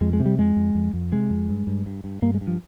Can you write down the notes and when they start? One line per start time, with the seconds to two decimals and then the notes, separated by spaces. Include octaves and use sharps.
0.01 F2 G#3
0.13 G#3
0.20 C3
0.26 G3
0.38 F2 G#3
0.56 F2
0.75 F2
0.93 F2
1.12 C3 G#3
1.30 F2
1.49 G2
1.67 G2
1.86 G2
2.04 G2
2.22 G2 A#3
2.34 G#3
2.41 G2
2.47 F3